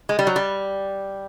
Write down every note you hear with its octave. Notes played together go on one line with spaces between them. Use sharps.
G#3
G3
F#3
G3